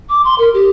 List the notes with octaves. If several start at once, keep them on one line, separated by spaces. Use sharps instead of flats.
D6
C6
A#4
G4